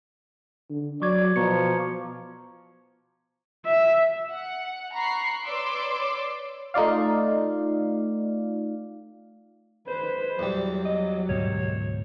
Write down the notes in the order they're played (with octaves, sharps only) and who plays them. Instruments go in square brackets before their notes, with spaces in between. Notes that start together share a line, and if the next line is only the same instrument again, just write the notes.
[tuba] D3
[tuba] F#3 [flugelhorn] D5 [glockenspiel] C#6 D6 G#6
[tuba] B2 [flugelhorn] F3 [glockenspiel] A#5 C#6 C#7
[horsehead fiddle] E5
[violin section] F#5
A#5 B5 C#6 F#6 C7
B4 C#5 D5 C6 D6 E6
[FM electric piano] A3 D#4 F4 D5 F5
[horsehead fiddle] B4 [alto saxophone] C5
[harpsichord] E2 G3 [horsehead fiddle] F#3
[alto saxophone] D#5
[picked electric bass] D2 G#2 B2 [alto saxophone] C#5